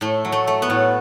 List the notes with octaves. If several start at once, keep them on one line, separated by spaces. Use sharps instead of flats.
A2 A3
F#3
A3
A3
B3
A2